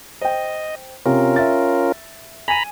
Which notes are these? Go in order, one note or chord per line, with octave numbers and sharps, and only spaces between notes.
C5 D#5 G5
C3 C#4 F4 A#4
E5 A6
G#5 A#5 B5 D#7